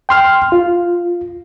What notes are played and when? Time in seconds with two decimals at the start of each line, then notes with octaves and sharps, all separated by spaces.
0.09 G5 C6 F6
0.52 F4